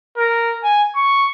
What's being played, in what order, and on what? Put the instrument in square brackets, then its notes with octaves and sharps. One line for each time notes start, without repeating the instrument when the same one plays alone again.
[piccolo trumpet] A#4
G#5
C#6